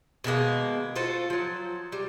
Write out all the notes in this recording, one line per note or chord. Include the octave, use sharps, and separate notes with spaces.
B2 D#3 G#3 A#3
F4 F#4 A4 C5
F3 F#3
G3